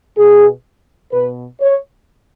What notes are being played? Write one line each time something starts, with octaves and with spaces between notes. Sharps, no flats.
B2 G#4
B2 B4
C#5